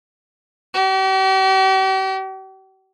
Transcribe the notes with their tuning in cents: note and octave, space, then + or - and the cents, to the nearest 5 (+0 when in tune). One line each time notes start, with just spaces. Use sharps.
G4 -45